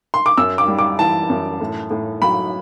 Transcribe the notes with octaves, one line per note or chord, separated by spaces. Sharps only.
C6
D6
F#2 E6
D6
G3
D6
E3 A5
F#2
A2
A2
F#3 B5